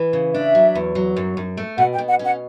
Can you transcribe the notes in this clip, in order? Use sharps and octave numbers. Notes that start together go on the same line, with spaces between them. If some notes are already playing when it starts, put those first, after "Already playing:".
Already playing: E3
C#3
D4 E5
F#3
E2
F#3
F#2
F#2
A3
B2 F#5
G5
B2
F#5
C#4 F#5